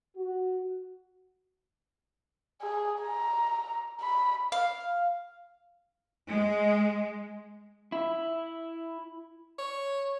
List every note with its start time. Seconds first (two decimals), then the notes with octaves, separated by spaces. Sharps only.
0.17 F#4
2.61 G#4
3.03 A#5
4.01 B5
4.52 F5
6.28 G#3
7.92 E4
9.58 C#5